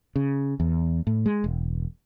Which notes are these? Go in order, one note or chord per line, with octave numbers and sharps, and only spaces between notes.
C#3
E2
A2
G#3
E1